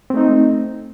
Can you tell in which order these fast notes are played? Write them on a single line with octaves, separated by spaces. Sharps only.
C4 A3 D#4